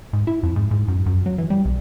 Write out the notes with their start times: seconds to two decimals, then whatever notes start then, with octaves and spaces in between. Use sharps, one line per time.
0.13 G#2
0.27 E4
0.43 F2
0.56 G#2
0.71 G#2
0.88 F#2
1.06 F#2
1.26 F#3
1.38 E3
1.50 G3
1.65 B1